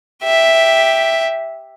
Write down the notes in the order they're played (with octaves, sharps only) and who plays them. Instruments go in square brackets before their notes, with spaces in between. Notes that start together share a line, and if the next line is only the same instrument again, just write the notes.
[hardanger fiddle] G4 E5